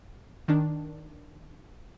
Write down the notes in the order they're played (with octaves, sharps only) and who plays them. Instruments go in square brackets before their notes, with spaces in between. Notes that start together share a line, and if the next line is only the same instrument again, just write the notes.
[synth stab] D#3 D4